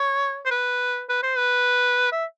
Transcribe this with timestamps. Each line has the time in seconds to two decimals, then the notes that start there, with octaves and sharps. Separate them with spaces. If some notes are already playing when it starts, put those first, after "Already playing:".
Already playing: C#5
0.46 C5
0.51 B4
1.09 B4
1.23 C5
1.37 B4
2.12 E5